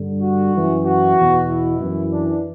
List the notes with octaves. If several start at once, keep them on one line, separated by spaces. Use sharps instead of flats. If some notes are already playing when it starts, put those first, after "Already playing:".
Already playing: G2 D3
F#4
F#2 E3
F#4
E2 B2
E4
F#2 E3
D4